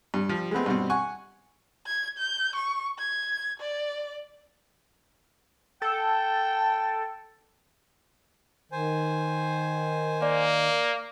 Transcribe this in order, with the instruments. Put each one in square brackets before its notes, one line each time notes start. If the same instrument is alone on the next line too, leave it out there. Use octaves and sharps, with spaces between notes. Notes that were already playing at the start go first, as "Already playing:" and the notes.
[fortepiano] G2
F3 G3
G#3 A3 B3 C4
G2 B2 C4
F#5 G#5 C#6
[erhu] G#6
G6
C#6
G#6
D5
[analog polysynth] A4 [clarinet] G5
[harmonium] D#3 [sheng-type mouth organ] C5 G#5
[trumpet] A#3 [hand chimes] D5